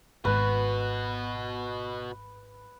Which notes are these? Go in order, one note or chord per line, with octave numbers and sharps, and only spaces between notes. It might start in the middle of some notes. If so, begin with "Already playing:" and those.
G#1 G#2 B2 F#4 B4